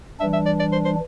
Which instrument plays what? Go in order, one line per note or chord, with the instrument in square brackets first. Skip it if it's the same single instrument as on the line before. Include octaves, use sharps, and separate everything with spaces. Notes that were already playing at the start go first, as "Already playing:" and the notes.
[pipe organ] E3 G3 D4 [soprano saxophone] E5
[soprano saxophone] E5
D5
D5
C5
C5